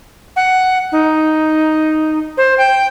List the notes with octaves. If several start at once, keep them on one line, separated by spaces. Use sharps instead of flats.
F#5
D#4
C5
G5